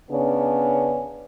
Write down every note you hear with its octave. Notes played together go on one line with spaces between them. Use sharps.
C#3 B3 C#4 D4